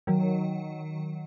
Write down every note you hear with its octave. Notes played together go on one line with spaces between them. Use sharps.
D#3 F#3